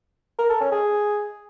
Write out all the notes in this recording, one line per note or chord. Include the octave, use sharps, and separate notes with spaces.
A#4
A4
C#4
G#4